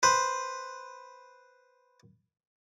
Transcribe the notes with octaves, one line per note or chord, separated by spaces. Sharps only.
B4 C5